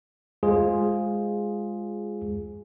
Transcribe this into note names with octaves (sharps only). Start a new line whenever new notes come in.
G#3 F4 G#4 C5